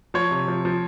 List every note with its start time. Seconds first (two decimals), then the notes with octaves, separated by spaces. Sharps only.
0.14 F3 C#5
0.31 C3
0.48 F3
0.65 F3